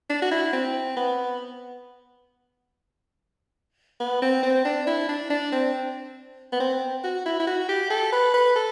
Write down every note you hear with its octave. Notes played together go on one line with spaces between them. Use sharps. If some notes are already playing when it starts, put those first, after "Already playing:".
D4
F#4
E4
C4
B3
B3
C4
C4
D4
E4
D4
D4
C4
B3
C4
F#4
E4
E4
F#4
G4
A4
B4
B4
A4